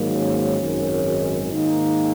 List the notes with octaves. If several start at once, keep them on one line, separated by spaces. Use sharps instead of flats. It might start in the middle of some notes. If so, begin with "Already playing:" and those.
Already playing: G#2 D#3 F#3 A#3
C#4
G#1 F#2 D#3 G#3
G#2 D#3 A#3 D#4